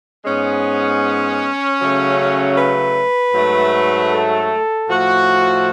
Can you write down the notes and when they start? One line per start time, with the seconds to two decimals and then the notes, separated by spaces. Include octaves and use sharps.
0.25 G#2 G#3 B3 C#4
1.80 C#3 F#3 A3
2.57 B4
3.34 G#2 F#3 A3
4.12 A4
4.89 A2 F3 A3 F#4